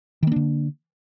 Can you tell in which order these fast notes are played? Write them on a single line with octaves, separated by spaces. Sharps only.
D#3 A#3 D4 D3